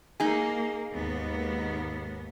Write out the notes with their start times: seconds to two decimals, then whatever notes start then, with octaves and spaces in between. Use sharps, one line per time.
0.20 A#3 D#4 G#4
0.93 D#2 G#2 B3